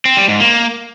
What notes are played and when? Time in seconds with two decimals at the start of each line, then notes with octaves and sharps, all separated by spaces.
0.05 C4
0.17 G3
0.29 G#2
0.40 A#3